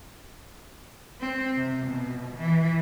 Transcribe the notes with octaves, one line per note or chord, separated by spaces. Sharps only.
C4
C3
B2
E3